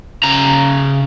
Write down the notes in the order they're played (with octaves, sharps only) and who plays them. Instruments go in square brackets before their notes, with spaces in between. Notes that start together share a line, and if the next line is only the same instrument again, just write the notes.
[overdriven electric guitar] C#3 A#5